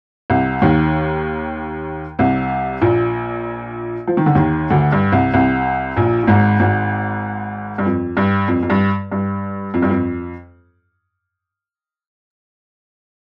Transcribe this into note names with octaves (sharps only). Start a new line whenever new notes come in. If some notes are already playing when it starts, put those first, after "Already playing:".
C2 C3
D#2 D#3
C2 C3
A#1 A#2
F3
D#3
D3
D#2 D#3
D2 D3
G2
C2 C3
C2 C3
A#1 A#2
A#2
G#1 G#2
G#1 G#2
G2
F2
G2
F2
F2
G2
G2
F2
G2
F2